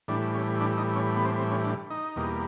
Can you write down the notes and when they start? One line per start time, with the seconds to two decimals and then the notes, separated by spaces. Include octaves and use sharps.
0.08 A2 E3 G3 D4
0.35 C#4
0.61 D4
0.78 D#4
0.96 C#4
1.16 B3
1.25 C4
1.38 C4
1.51 C#4
1.64 D4
1.90 D#4
2.16 E2 B2 G3 A#3